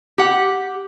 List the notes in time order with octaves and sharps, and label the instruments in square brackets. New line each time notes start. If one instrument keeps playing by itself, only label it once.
[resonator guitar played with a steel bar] G4 F#5